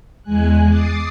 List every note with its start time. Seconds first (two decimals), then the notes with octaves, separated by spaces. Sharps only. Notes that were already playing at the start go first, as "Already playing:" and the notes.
0.23 E2 G#3 G#5 F#6
0.68 D6 D#6 A6 C7